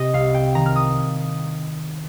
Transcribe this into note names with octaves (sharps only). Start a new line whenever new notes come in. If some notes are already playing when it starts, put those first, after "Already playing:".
Already playing: C3 D#5
C2 F5
G5
D#3 A#5
F6
D#6